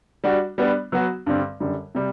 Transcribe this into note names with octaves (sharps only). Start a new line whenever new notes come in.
G3 D4 F#4
G3 B3 D4
F#3 B3 F#4
G2 D3 G3 C4
F#2 D3 G3
C3 G3